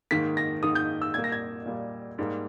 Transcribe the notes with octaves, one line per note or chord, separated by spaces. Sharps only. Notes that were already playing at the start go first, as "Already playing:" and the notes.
G#2 D#3 A#3 B6
A#6
G#2 D#3 A#3 D#6
G6
E6
A#2 G3 A#3 G#6
A#6
G#6
A#2 G3 A#3
G#2 G3 A#3